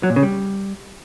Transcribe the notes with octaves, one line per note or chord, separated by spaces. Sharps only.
F#3
A#2
C#3
G3